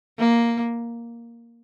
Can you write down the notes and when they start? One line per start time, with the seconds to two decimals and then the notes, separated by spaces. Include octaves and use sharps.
0.19 A#3